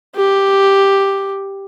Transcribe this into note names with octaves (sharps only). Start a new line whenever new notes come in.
G4